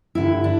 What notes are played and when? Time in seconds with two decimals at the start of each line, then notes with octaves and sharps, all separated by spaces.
0.15 G2 D3 E4
0.44 D4